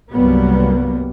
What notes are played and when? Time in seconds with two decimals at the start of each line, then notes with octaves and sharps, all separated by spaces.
0.12 C2 G2 F#3 G3 A#3 B3